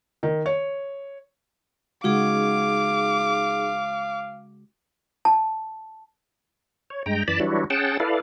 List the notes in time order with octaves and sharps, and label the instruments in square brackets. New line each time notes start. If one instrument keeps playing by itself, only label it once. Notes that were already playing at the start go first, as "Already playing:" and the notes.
[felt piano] D#3
C#5
[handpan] C#3 G#3 F#4 [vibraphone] D#4 G#4 [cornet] F5 [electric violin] D6
[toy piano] A5
[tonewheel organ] C#5
G2 G#3 G5 A#5
F#2 E3 D5 A5 B5
E3 F#3 G3 D4 E4 F#4
C#4 G#4 F#5 G5 A5
E4 A4 B4 D5 F5